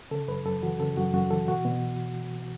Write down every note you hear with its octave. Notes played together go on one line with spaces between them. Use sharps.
C#3 A4
F#2 B4
F#2 A4
E3 F#4
C#3 A4
F#2 F#4
F#2 F#4
E3 A4
B2 F#4
B2